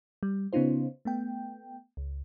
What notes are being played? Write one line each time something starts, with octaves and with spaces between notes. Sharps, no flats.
G3
C#3 B3 C#4 D#4 F4 C5
A3 B3 G5
C#2